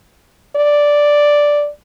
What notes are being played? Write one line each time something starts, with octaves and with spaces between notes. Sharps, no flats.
D5